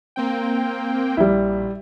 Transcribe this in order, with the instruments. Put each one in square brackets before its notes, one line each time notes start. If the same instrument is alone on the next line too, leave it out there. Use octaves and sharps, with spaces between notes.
[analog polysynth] A#3 C4 G5
[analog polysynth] A#1 [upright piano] G3 E4